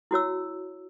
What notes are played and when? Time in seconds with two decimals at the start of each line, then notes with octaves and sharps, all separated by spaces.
0.11 E4 F#4 C#5 E6